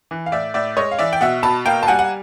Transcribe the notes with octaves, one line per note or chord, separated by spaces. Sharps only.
E3
F5
A2 D5 E5
A2 D5 E5
G#3 C#5 D#5
F5
E3 D5 E5
G5
B2 E5 F#5
B2 A5 B5
A#3 F5 G5
A5
G3 F#5 G#5
F#5